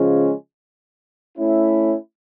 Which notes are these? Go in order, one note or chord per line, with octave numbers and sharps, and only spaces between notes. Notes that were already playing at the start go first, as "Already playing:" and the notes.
Already playing: C#3 F3 G#3 C#4
A3 C#4 E4